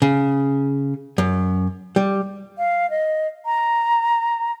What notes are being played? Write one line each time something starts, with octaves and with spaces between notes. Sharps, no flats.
C#3
F#2
G3
F5
D#5
A#5